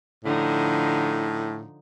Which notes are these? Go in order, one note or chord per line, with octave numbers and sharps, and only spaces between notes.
A2 D3 F3 D#4